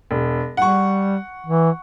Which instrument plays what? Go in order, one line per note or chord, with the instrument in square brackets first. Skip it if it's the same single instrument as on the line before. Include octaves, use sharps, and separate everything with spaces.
[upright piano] E1
[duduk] G3 [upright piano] F#5 C#6
[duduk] E3